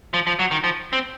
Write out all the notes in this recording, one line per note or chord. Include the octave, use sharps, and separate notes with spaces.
F3
F3
F#3
D#3
F3
C4